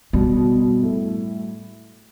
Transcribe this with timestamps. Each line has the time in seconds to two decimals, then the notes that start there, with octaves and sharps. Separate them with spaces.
0.13 B2 G3
0.37 B2
0.60 B2
0.83 A2